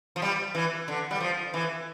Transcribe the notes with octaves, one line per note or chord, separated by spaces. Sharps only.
F3
G3
E3
D3
G3
F3
E3